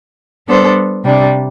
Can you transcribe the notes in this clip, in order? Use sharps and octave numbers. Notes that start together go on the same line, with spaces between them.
G3 B3 D4 A4 C5
C3 G3 D4